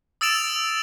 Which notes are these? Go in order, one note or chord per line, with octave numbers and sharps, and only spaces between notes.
D#6 E6 A6 D7 E7 F7